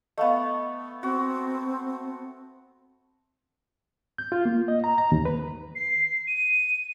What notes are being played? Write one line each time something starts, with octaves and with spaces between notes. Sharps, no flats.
A3 B3 D#5 F5
C4 F#4
G6
F4
A#3
D#5
A#5
A#5
D#2
B4
C7
D#7